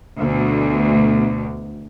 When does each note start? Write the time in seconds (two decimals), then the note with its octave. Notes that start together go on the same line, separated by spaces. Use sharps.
0.19 D2 B2